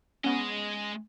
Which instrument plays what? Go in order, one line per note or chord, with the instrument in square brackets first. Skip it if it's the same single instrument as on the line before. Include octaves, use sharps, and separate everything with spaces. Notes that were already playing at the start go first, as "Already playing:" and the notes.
[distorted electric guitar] G#3 D#5 [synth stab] B3 C#4